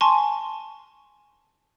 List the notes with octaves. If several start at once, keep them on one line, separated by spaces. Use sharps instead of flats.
G#5 A5 C6 C#6